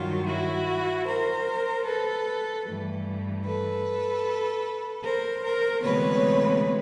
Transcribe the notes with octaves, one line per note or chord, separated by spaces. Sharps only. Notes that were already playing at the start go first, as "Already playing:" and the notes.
Already playing: G2 D#3 F#3 F4
E4 F#4
A#4 C5
A4 B4
G2 E3 A3
A4 B4
A#4 C5
A#4 C5
D2 C3 E3 G#3 B3 B4 C#5